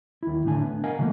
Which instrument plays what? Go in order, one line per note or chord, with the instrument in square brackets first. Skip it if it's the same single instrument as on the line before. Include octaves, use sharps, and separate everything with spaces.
[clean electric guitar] D#2 E4
A2 D3 D4 G#5
B3
A#4 D#5 F5 F#5 G#5
C#3 E3 F#3 A3 A#3